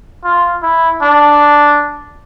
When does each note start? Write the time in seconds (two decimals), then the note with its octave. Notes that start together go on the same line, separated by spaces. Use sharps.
0.24 F4
0.63 E4
1.02 D4